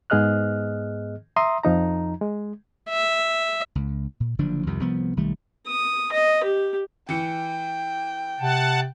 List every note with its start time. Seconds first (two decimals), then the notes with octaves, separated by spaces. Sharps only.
0.10 G#2 B3 G#4 D#5 F6 F#6
1.36 E5 A#5 C6 D#6
1.63 F2 F3 D#4 A#5
2.21 G#3
2.89 E5
3.75 C#2
4.20 A#2
4.39 F#1 D3 F3 D4
4.67 C2 F2 C3 D#3
4.80 C2 F3 B3
5.17 B1 D#3 G3 A3
5.67 D#6
6.12 D#5
6.43 G4
7.09 E3 G5 C#7
8.40 C3 F#5 A5